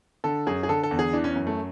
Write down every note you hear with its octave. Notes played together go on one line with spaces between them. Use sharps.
D3 A4
F#2 G#4
G#4
D3 A4
A4
E2
G#4
E3 D4
C#4
F#2
A3